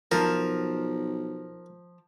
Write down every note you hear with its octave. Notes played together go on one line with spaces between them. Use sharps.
B1 F3 A#4